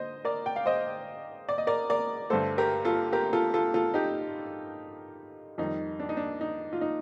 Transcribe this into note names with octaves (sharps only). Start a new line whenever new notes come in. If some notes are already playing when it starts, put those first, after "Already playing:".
Already playing: D3 C5 D#5
A#4 D5
G5
F5
C5 D#5
D5
D#5
A#4 D5
A#4 D5
G2 D3 A3 A4 C5
G4 A#4
F4 A4
G4 A#4
F4 A4
F4 A4
F4 A4
D#4 G4
F2 D#3 G3 D#4
D4
D#4
D4
D#4
F4
D#4